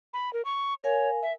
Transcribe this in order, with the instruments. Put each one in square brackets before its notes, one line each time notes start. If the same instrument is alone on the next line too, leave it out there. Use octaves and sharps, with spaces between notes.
[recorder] B5
A#4
C#6
[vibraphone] A#4 F5 G#5 [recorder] C#5
[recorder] E5